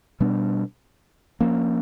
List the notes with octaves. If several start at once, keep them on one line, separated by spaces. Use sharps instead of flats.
B2 G3 B3 D4
F3 A#3 C#4